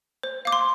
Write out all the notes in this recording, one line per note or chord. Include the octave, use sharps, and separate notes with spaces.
C5
F5 D6
C6